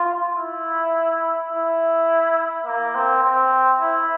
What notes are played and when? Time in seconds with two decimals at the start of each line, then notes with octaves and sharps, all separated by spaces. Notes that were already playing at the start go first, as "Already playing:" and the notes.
Already playing: F4
0.37 E4
1.51 E4
2.66 A#3
2.95 C4
3.23 C4
3.80 E4